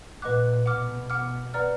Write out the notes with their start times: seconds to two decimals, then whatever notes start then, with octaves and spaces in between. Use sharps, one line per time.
0.22 A#2 B4 D#5 F#5 D6 F#6
0.66 B2 F#5 D6 F6
1.10 F#5 D6 F6
1.54 B4 D5 F#5 A#5 F6